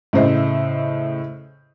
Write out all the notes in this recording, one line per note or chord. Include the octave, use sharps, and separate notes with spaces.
A2 C#3 C5 D#5 E5